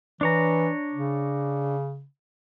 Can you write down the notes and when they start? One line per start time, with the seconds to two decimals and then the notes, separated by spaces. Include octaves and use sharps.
0.21 E3 D4 C#5 A#5
0.94 C#3